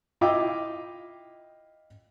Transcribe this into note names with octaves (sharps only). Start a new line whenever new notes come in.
E4 F4 D#5 F5 G5 D6